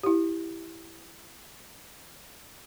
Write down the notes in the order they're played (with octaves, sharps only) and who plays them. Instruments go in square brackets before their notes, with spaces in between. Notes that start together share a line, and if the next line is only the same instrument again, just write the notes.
[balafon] E4 G4